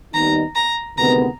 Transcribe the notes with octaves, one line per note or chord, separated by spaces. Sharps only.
D#2 D#3 G3 B3 D#4 A#5
A#5
D2 C3 D#3 G#3 B3 A#5